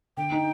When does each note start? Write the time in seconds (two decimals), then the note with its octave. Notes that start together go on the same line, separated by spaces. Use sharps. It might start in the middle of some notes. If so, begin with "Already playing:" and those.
0.17 D3 G5
0.32 D#4